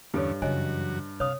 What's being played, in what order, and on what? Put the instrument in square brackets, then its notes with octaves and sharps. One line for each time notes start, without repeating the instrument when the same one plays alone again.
[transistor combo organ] E2 D3 C#4 [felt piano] G2 [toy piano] G4 A4 C#5
[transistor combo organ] F#2 F#4 [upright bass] C#3 E3 [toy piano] C#5 D#5 G#5
[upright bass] C3 [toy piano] C#5 D#6 [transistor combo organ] F5